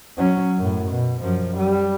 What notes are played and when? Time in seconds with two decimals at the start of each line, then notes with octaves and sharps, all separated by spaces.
0.17 F#3 C#4
0.58 F#2 A2
0.90 B2
1.21 F#2 F3
1.57 G3